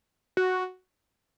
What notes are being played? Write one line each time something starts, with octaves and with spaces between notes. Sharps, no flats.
F#4